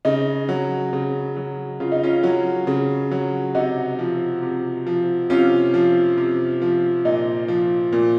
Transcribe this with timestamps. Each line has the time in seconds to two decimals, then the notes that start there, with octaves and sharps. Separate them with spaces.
0.05 C#3 D#4
0.49 F#3
0.93 C#3
1.37 F#3
1.80 C#3 F4
1.92 D#4
2.03 C#4 F4
2.23 F#3
2.67 C#3
3.11 F#3
3.54 C3 D#4 F#4
3.99 F3
4.42 C3
4.87 F3
5.30 C3 C#4 F4
5.74 F3
6.17 C3
6.62 F3
7.05 A#2 D#4
7.48 F3
7.92 A#2